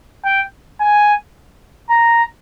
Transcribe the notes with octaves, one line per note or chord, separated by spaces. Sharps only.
G5
G#5
A#5